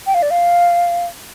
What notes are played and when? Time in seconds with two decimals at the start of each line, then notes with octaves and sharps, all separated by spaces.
0.07 G5
0.14 F5
0.22 D5
0.31 F5